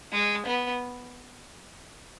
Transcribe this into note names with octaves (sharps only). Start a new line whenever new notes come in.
G#3
B3